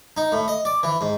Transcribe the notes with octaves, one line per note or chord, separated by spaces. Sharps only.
D#4
A2
D#5
D5
E3
G#2